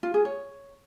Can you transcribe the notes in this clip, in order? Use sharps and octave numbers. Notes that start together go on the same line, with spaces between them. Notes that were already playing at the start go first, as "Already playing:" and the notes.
F4
G#4
C#5